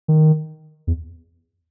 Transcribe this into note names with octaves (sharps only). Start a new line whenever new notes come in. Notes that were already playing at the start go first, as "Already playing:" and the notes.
D#3
E2